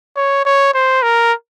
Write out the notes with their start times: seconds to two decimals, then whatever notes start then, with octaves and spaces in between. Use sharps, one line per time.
0.16 C#5
0.45 C#5
0.74 C5
1.03 A#4